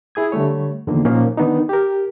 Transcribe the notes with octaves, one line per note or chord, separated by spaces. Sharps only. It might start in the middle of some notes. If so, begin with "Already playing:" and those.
E4 G#4 D#6 G#6
D3 G3 A3 C#5
E2 D3 D#3 F3 A#3
A#2 F3 A#3 C#4 D#4
D#3 B3 D4 D#4
G4 A#4